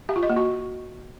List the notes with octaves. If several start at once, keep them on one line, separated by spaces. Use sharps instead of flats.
G4
F4
D#5
A#3
F#4